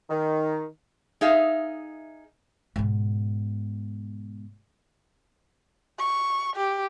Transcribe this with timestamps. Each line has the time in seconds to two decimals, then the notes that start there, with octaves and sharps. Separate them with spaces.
0.10 D#3
1.21 D#4 G#4 E5 F5
2.76 G#2 B2
5.99 C#6
6.56 G4